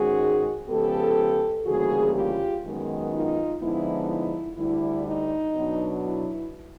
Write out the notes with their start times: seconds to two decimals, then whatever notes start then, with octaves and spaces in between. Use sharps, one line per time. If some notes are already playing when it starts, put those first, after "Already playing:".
Already playing: G#2 D#3 G#3 C#4 F#4 G#4
0.69 C#3 F3 G#3 B3 G4 A4
1.66 D2 C#3 E3 G3 A#3 F#4 G#4
2.14 F4 G4
2.64 F#2 D#3 G#3 B3
3.12 D#4 F4
3.61 D3 F3 G#3 B3 D#4 E4
4.09 E4
4.58 D2 D3 G3 E4
5.06 D#4
5.56 B2 F#3 B3 D4
6.05 E4